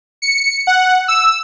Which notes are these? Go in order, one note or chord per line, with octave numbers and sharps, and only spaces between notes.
C#7
F#5
E6